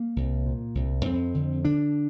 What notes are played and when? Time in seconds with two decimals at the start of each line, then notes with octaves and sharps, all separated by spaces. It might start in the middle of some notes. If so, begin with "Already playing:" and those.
Already playing: A#3
0.16 C2
0.46 A#2
0.75 C2
1.05 F2 C4
1.35 D3
1.65 D3 D4